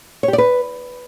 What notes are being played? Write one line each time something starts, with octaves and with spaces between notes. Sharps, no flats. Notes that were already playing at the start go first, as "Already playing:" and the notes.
C#5
G4
D5
B4